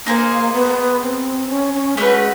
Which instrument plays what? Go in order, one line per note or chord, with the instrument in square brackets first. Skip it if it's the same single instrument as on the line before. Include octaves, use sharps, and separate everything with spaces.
[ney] A#3 [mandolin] D#4 G#4 C5
[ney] B3
C4
C#4
C#4
[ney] G#3 [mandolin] A3 C#4 F#4 B4